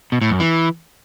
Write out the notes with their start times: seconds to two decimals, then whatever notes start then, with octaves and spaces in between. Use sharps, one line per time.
0.12 B2
0.21 A2
0.31 F#2
0.40 E3